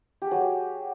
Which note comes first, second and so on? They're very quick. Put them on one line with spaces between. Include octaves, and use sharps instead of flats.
G4 G#4 F#3